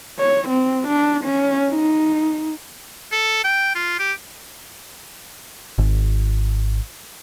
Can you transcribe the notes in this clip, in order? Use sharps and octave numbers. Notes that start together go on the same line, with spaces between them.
C#5
C4
D4
C#4
D#4
A4
G5
F4
G4
G#1